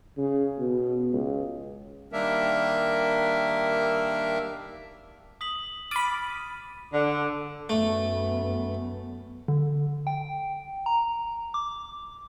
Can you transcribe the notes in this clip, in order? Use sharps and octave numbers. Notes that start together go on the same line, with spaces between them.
C#3
B2
C#2
D#3 G3 A#3 D4 A#4 E5
D#6 B6 F#7
B5 D6 F6 A6 D#7
D3
F#2 A3 B3
D3
G5
A#5
D6